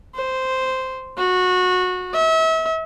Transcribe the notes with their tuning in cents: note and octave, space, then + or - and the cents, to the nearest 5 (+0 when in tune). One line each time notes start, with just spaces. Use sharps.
C5 -5
F#4 -20
E5 -35